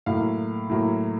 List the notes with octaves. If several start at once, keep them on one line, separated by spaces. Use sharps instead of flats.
A2 F#3 A#3 F5
A2 F#3 A#3